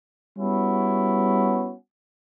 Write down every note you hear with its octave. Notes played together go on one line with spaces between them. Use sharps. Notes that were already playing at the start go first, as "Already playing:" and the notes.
G3 B3 C#4 E4 F#4